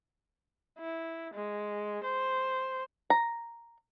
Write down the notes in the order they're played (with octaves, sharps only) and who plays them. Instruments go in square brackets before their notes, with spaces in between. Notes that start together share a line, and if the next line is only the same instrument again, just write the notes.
[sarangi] E4
G#3
C5
[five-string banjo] A#5